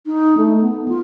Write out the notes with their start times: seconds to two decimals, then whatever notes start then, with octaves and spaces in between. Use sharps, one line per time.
0.06 D#4
0.37 A3
0.61 B3
0.88 F4